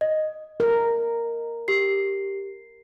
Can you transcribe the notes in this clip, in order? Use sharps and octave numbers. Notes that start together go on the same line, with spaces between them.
D#5
A#4
G4 C7